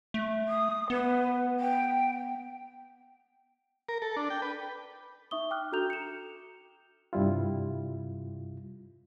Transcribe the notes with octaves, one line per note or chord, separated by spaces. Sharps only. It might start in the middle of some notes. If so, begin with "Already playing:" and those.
A3
D#6
B3 B4
G5
A#4
A4
D4
G5
B4
D#4 E5 C#6 D#6 G7
G5 D6 D#6 F6 F#6
D4 F#4 A4 A#5 G6 F7
C#7 E7
G2 C3 G3 E4 F4